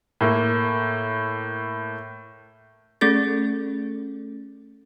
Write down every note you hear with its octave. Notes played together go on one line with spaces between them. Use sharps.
A2 A#3
A3 C#4 G#4 A4 A6